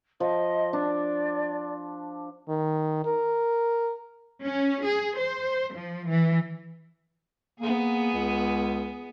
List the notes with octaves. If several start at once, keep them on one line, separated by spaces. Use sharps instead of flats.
F3 D#5
D4 D5
D#3
A#4
C#4
G#4
C5
F3
E3
A#3 B3 G#4
C#2